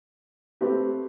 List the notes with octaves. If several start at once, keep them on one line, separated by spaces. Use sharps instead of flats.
A3 C4 G4 B4